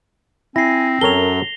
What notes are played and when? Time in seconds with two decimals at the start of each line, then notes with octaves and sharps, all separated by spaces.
0.56 C4 E4 G#5 A#6 C7
1.01 F#2 F#3 A4 A#4 C#5 F7 G7